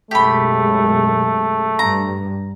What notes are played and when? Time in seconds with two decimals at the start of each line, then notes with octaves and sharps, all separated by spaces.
0.11 B1 F#2 G#3 A3 G4 B5
1.79 G2 A#5